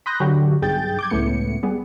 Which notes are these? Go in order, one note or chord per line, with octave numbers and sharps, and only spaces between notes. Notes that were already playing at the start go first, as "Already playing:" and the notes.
B5 C6 D#6 F#6 G6 A#6
D3 F#3 F#4 G4
B1 G2 G#4 G5 G6 A6
D6 G6 G#6
C#2 A2 A3 B3 C#7
G3 B3 G#4